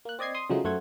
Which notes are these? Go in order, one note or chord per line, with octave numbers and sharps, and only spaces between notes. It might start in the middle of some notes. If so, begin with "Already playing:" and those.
A#3 F#6
C4 D5 D#5 G#6 C7
C6 D#6
C#3 F3 F#3 G#3 A3 D#4
F#2 A3 C5 F#5 G#6